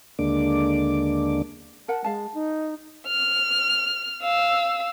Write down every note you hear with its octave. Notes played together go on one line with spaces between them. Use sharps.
D#2 D3 G#3 A#3 D4 D6
A#4 F#5 A5
G#3 F5 A5
D#4
F6
F5 E6